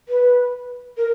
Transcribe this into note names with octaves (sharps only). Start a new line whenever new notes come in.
B4
A#4